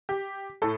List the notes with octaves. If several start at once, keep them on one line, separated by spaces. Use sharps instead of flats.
G4
A2 A4